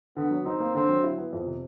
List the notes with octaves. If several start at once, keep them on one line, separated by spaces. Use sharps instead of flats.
D3 B3
F#3
C4 D#4
A#3
D3 C4
F#3
E4
B3
F2
C3